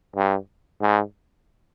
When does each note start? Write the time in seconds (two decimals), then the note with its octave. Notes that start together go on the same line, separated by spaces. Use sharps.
0.16 G2
0.81 G#2